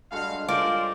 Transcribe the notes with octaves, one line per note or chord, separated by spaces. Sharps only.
G2 G#3 F#4 A4 F5
C#4 F4 A#4 C5 D5